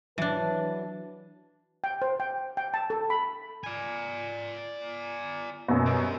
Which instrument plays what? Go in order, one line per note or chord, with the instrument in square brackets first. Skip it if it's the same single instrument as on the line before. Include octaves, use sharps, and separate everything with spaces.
[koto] E3 D4 [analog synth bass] F#3 [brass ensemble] B4 A5
[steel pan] G5
C5
G5
G5
A5
A4
B5
[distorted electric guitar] D5 G#5
[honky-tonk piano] F#2 B2
[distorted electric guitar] G3 C4